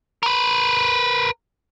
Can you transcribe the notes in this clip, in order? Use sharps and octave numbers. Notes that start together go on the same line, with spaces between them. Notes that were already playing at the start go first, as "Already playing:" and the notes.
A#4 B4